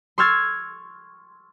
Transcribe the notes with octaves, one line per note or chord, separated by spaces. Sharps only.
C6 C#6 E6 F6 G#6 A6